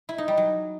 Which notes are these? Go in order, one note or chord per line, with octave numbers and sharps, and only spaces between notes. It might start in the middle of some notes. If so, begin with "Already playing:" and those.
E4
D#4
G3
F#3